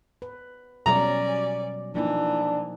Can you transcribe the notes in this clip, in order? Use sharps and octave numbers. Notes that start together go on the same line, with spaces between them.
B4
B2 F#3 G3 C#4 D5 A#5
E3 F3 A#3 D4 D#4